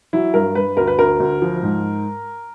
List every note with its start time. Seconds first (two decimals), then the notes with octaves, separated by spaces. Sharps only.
0.13 F#3 E4
0.34 G2 A#4
0.55 G2 B4
0.77 D2 A#4
0.87 B4
0.99 D2 A#4
1.20 D2
1.42 F3
1.63 G#2